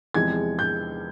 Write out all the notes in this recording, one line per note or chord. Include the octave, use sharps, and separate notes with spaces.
E2 C3 F3 G#3 G#6
G6